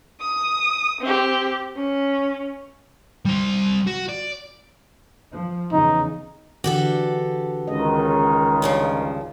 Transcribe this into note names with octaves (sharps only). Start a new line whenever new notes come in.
D#6
C4 G4
C#4
G3 C5
F#4
D5
F3
E2 C#3 D#4
D3 E3 F#4 G4 A4
C#2 D#3 D#5
G2 C#3 F3